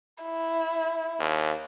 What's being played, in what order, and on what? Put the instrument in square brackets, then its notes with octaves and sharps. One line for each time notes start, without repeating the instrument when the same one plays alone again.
[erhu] E4
[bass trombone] D#2